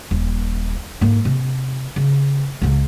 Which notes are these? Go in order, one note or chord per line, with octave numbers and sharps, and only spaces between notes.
D#1
G#2 A#3
C3
C#3
C#2 C#3